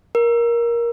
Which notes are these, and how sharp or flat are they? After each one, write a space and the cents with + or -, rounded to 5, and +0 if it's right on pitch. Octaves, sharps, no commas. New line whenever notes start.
A#4 +15